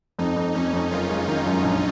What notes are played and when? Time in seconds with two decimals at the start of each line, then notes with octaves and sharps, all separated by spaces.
0.19 F2 D#4
0.36 F2
0.54 F2 C#4
0.73 F2
0.91 F#1 F4
1.10 G#3
1.28 D#3 D#4
1.46 F#2
1.65 A#1